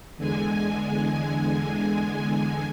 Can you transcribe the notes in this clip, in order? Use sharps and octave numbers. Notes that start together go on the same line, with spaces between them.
E2 D3 G#3 G#5